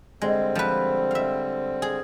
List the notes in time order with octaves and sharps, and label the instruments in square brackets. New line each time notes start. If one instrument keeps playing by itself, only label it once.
[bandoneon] D3 G3 C4 [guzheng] G#3
[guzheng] F3 B4
E5 F5
G#4